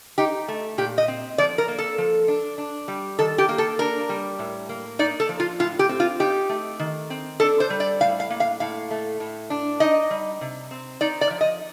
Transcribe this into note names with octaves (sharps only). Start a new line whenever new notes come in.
D#4 G4
A3
A#2 G4
D#5
C4
F3 D5
A#4
A#3
A4
F3
D4
D4
G3
D#3 A4
G4
A#3
A4
D4 A#4
G3
A2
A#3
D#4 D5
A4
F3
F4
A2 F4
G4
C4
F4
D#4 G4
A3
D#3
C4
D4 A4
C5
G3
D5
A2 F5
F5
A#3
F5
A2 F5
A3
A2
D4
D#4 D#5
G3
C3
C4
D#4 D5
D5
F3
D#5